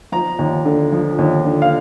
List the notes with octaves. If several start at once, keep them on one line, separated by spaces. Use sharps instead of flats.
F3 A#5
D#2
D3
F3
D#2
D3
F5